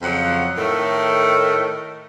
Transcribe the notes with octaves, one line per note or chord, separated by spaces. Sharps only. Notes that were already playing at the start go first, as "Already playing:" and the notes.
F2 C#3 F3 F#3 F#5
A2 D#3 A3